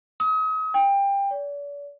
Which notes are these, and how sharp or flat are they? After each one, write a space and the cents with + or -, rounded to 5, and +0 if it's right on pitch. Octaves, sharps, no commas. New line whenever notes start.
D#6 +40
G5 +20
D5 -45